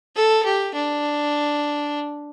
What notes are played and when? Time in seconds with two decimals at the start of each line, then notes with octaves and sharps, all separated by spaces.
0.15 A4
0.45 G4
0.74 D4